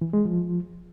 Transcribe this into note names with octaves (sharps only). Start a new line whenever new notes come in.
E3
G#3
F3